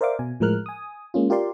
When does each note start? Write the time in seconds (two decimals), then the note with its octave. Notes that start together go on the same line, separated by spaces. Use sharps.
0.01 A#4 C5 D5 E5 F5 D6
0.19 B2 G#5
0.40 A2 F3 G#3 A#4 F6 F#6
0.66 G#5 D#6
1.14 G#3 A#3 C#4 F4
1.30 F4 G4 A#4 D5 C6